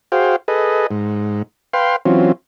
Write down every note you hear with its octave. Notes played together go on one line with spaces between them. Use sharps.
F#4 G#4 C5 F5 G5
G#4 A4 B4 D#5
G#2
B4 F5 G5 C6
E3 F#3 C4 C#4 F4